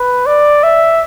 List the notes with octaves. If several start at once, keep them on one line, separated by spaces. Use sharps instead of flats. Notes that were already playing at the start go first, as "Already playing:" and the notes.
Already playing: B4
D5
E5